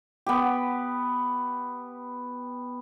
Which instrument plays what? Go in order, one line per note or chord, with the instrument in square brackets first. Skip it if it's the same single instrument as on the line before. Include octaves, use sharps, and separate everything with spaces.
[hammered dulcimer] B3 G4